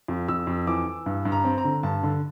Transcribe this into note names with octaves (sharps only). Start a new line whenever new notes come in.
F2
F2 E6
F2
E3 D6
E3
G2
G2
A#5
C4
A#5
D3
G2 A5
D3